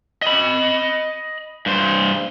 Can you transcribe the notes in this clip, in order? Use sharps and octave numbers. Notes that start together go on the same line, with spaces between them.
D#5 B5
G2 C5